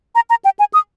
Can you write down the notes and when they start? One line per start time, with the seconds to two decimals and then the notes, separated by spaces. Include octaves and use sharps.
0.15 A#5
0.30 A#5
0.45 G5
0.59 G#5
0.74 D#6